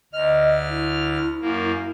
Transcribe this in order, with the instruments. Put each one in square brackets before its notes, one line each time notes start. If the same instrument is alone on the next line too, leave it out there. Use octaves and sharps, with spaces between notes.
[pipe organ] D2 F6 [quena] D#5
[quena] E4
[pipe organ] F#2 A#3